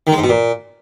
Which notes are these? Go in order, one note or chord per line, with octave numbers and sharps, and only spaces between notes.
D#3
G#3
G#2
B2
A#2